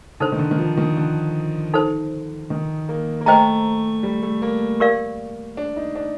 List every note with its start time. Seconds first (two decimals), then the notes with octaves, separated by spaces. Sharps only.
0.20 D3 D#4 A4 C5
0.32 D#3
0.39 D3
0.51 D#3
0.58 F3
0.77 D#3
0.97 D3
1.74 D#4 A4 C5
2.50 D#3
2.89 A#3
3.21 A#3
3.26 A3 C5 D#5 G5 A#5
4.03 G3
4.23 A3
4.42 A#3
4.80 G4 A#4 D5 F5
5.57 D4
5.76 D#4
5.95 D4